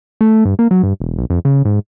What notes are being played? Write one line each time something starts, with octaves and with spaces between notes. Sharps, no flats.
A3
G2
A#3
F#3
G2
E1
B1
F2
C#3
G#2